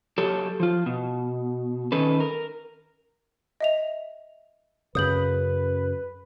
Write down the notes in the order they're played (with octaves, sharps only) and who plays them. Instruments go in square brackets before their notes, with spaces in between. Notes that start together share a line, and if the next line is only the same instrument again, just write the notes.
[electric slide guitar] F#3 G4 A4 C#5
F3 F4
B2
D#3 C#4 A4 B4
A#4
[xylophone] D#5 E5 F7
[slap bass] F#2 C#3 [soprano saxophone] B4 [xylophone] D#6 G6 F#7